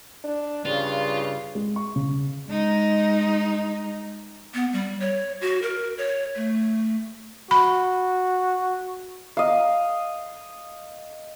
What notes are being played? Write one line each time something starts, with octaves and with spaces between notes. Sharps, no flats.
D4
G2 C#3 F4
G#3
C#6
C#3
G#3 D#4
B3
G3
C#5
F#4
A#4
C#5
A3
F#4 B5
D#5 F5